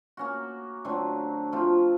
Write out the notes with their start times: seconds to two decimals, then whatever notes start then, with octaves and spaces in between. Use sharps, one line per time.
0.17 A#3 C#4 F#4
0.85 D3 F#3 A3 C4
1.52 F3 A3 C4 F4